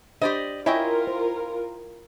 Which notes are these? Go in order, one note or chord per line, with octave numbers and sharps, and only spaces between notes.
D4 G4 C5 D5 D#5 B5
E4 F4 A#4 C#5 D#5 E5 G5 G#5
C5